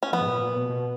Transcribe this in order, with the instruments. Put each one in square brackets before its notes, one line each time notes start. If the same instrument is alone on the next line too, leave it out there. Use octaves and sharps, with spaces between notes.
[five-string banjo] C#4
[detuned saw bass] F3 [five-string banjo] B3
[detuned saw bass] G#2
A#2
A#2
B2
B2